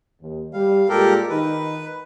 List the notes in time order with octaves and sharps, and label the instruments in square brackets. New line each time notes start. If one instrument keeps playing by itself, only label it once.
[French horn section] D#2
[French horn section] G3 [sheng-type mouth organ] F5
[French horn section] A#2 G#3 [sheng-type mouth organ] G4 A4 A#4
[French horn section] D#3 D#4 [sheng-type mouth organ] B4